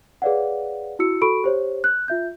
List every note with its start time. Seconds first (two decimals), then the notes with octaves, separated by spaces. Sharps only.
0.22 G#4 B4 C#5 D5 F5 F#5
0.99 E4 F#4 E6 C#7
1.21 F#4 A4 B5 C#6 D7
1.44 G4 C5 C#5
1.84 F#6
2.08 F4 E5 G6